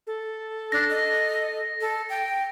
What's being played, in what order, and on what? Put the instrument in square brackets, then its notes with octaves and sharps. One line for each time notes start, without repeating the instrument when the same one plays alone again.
[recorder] A4
[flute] D4 [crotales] A#6
[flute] D#5
A4
G5